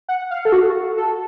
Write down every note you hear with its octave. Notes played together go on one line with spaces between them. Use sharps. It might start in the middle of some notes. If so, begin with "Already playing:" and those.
F#5
F5
A4
F#4
A4